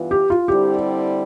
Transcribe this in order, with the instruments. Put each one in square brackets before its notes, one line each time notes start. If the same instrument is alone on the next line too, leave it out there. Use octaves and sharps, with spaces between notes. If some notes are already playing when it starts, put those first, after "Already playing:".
Already playing: [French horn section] G2 E3 B3 F4
[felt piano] G4
F4
[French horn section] D3 G3 C4 E4 [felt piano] G4